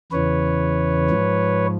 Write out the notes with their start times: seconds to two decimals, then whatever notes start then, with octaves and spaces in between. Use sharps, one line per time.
0.12 E2 C#3 E3 B4 C#5
1.10 G#2 F3